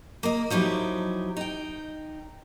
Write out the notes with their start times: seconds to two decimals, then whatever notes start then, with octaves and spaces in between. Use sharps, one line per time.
0.23 A#3 D#5
0.50 F3 F#3 D#4 E4 G4
1.37 D#4 G5